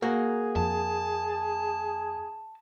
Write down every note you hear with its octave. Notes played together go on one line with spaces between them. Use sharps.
A#3 F#4 G#4
F2 A5